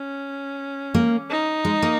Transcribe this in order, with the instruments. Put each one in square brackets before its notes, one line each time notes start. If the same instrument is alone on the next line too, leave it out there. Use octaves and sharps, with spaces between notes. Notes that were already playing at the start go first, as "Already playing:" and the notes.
Already playing: [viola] C#4
[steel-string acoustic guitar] A#3
[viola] D#4
[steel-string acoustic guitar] G#3
A#3